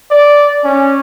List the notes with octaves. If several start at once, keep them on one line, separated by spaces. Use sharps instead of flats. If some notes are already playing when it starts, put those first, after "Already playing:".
D5
C#4